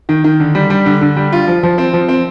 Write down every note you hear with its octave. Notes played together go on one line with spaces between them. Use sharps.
D#3
D#3
D3
G3
G3
D3
D3
G3
F4
F3
F3
C4
F3
C4